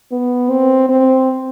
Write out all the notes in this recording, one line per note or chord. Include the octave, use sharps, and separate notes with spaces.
B3
C4
C4